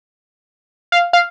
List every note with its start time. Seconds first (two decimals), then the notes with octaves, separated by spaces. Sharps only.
0.92 F5
1.13 F5